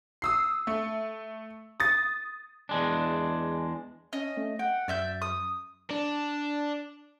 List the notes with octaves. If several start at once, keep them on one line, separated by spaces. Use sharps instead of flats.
D#6 E6 C7
A3
D#6 A6
E2 G#3 D4
C#4 D#5
A3
F#5 G5
F#2 D5 E5 G6
D#6
D4